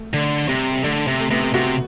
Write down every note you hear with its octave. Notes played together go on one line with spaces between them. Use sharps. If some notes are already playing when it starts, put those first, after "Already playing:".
Already playing: A3
D3 A3
C3 G3
G3
D3 A3
C3
A3
C3 B3
A3
C3 F#4